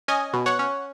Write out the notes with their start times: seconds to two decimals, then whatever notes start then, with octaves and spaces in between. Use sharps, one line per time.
0.08 C#4 D#5 G#5
0.33 B2
0.46 C#5 F#5
0.59 C#4